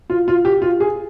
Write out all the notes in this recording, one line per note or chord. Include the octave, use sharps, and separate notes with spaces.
F4
F4
G4
F4
G#4